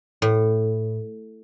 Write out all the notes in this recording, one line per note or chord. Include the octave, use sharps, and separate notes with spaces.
A2